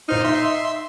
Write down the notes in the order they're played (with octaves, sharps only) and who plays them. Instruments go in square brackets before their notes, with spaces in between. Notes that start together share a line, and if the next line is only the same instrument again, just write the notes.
[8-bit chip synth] A#2 C5 F6 [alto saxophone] D#4
[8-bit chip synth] E5 C6